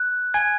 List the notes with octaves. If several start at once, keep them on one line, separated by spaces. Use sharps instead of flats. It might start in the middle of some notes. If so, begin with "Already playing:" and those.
Already playing: F#6
G#5 G#6